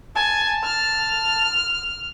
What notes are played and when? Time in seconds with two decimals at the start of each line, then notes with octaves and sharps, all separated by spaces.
0.16 G#5 A5
0.64 F6